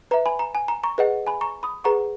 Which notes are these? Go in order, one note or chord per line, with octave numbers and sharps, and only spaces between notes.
B4 E5 A#5
G#5 B5
A#5
G#5
A#5
A#5 C#6
G#4 B4 D#5 F#5
G#5 B5
A#5 C#6
B5 D#6
G#4 B4 F#5 A#5 C#6